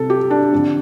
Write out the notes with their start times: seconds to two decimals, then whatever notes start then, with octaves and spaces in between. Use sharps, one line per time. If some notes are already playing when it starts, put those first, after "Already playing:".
Already playing: C2 C3 A4
0.10 G4
0.31 D4
0.52 F2 D3